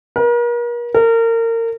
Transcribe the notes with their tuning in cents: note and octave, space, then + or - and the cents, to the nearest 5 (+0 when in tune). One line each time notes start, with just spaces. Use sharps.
A#4 +40
A#4 -30